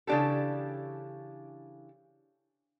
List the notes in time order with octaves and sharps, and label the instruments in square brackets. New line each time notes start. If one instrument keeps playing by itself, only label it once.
[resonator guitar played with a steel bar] C#3 E3 D4 G4 A4